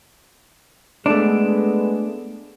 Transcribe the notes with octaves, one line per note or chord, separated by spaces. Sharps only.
G#3 A3 B3 D4